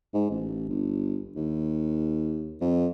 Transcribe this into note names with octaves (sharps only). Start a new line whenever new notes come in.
G#2
A1
G1
D#2
F2